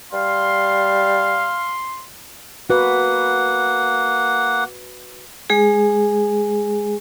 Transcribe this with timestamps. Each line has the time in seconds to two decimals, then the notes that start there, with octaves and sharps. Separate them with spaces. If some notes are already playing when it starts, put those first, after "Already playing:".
0.13 G3 F5 C6
2.70 A#3 F#4 B4 F#5
5.50 G#3 G#4